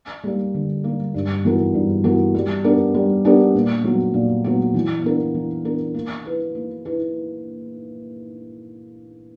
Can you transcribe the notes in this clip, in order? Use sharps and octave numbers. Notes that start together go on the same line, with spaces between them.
G3 A#3
D3
G3 A#3
G2
E3 B3 F#4 A#4
G2
E3 B3 F#4 A#4
G3
B3 D4 G4 A#4
G3
B3 D4 G4 A#4
A#2
F#3 B3 F#4
A#2
F#3 B3 F#4
E3
B3 D4 A#4
E3
B3 D4 A#4
A#3
E4 B4
A#3
E4 B4